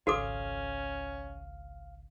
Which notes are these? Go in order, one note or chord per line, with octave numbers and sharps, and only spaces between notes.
G#1 C#2 C#4 F#4 A4 F5 D6